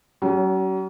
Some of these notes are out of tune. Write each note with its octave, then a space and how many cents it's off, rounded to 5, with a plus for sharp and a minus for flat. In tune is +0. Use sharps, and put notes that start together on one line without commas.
F#3 +40 C#4 +15